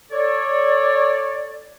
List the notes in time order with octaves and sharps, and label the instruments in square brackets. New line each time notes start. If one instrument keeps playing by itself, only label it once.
[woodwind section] A4 C#5 D5